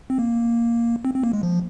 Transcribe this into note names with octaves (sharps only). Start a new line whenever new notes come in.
C4
A#3
C4
C4
A#3
G#3
F3